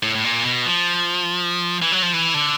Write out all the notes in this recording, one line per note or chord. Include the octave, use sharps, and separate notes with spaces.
A2
A2
A#2
B2
F3
E3
F#3
F3
E3
D3